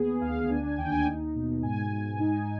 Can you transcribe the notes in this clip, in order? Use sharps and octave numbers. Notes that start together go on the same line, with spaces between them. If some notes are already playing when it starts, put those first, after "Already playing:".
Already playing: D#2 B3 G#4
D2 F5
D4 G#5
G#5
D#2 G5
G#5
D#4
B2
G#2 G#5
G#2
D#4